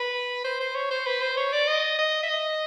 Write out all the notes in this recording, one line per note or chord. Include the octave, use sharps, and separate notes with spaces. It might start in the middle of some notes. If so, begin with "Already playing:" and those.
Already playing: B4
C5
C5
C#5
C5
B4
C5
C#5
D5
D#5
D#5
E5
D#5